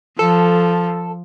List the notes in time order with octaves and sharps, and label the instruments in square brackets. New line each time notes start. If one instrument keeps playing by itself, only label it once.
[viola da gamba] F3 [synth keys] A4